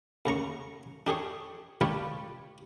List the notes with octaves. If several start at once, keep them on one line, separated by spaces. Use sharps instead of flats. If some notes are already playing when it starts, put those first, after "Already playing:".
D#2 C#3 A#5 C#6
D4 G4 G#4 C#5
D4 F4 G4 B4 C#5 D5